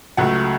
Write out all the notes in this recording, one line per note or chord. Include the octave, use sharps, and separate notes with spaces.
C#2 C#3 F#3 A3 F#5